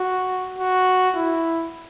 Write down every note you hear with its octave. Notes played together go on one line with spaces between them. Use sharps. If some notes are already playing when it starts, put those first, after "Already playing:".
Already playing: F#4
F#4
E4